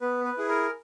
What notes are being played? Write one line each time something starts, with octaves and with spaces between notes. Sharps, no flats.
B3 B4
B4
E4 G#4
A#4